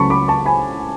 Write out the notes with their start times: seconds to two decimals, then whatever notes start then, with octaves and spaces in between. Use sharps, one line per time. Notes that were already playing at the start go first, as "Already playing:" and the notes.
Already playing: C#2 C#3 F#3 A3 A5 B5 C#6
0.10 B5 D6
0.28 A5 C#6
0.45 G#5 B5